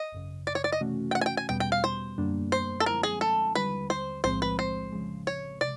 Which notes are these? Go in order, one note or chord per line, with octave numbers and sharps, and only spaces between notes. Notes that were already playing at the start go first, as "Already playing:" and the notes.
Already playing: D#5
G#1 F#2 C#3
D5
C#5
D5
D#5
C3 E3 A3 C#4 F#4
G5
F#5
G#5
G5
G#5
E2 B2 G3 B3 G5
G5
F5
C5
F#2 D3 G3 A#3 D4
C5
A4
D3 F3 G#3 C4 E4 A#4
G#4
A4
D#2 D3 G3 B4
C5
B1 A2 F3 G#3 C4 C5
B4
C5
C#3 F3 G#3
C#5
C3 D5